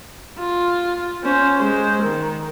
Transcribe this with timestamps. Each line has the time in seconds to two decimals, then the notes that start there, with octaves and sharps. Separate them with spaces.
0.39 F4
1.24 C#4 C5
1.58 G#3 C5
2.02 D#3